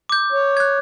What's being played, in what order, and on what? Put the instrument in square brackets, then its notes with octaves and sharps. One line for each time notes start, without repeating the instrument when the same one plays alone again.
[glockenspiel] D6 G6
[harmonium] C#5
[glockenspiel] F#6 G#6